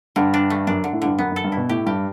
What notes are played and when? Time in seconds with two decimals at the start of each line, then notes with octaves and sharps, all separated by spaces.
0.16 G2 D3
0.34 D4
0.50 A3
0.67 F#2 D4
0.84 D3
0.93 A2
1.02 G2 D3
1.18 F#2 B3
1.32 F#2 A4
1.44 G2
1.52 B2 E4
1.69 A2 G4
1.86 G2 G4